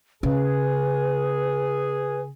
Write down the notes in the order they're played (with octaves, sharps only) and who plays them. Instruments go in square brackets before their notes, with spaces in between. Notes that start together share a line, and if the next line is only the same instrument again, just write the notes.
[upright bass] C#3 [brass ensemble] G#4 [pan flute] B4